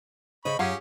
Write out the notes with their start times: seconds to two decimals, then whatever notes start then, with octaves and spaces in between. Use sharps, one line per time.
0.45 C#3 C5 D#5 B5 C#6
0.59 F#2 C#4 F4 G4 G#4 F5 F#5